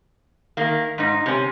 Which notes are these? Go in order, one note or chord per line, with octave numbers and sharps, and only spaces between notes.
D#3 A#3
G#2 D#4
C3 C#4